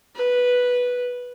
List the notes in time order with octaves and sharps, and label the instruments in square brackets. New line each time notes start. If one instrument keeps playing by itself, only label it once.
[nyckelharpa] B4